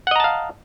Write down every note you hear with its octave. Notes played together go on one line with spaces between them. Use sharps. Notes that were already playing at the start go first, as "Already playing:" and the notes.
D#5 F5 F#5 A5 A#5